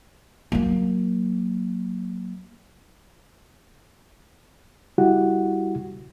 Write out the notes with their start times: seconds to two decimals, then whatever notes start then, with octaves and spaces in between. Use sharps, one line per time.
0.52 F#3 A#3
4.98 G3 E4 F#4 G4 F#5